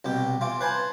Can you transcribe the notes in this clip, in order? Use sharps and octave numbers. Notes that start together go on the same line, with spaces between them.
C2 B2 G4
E3 F4 D6
B4 C5 G#5 A5 B5